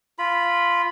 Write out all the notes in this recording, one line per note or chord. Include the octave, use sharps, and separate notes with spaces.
F4 B5